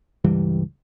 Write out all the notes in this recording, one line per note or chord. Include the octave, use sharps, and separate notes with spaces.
C#2 G2 E3 G3